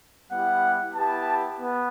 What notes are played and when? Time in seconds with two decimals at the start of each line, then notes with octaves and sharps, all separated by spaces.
0.31 G3 B3 E4 G4 F#5
0.95 B3 E4 G4 A5
1.60 B3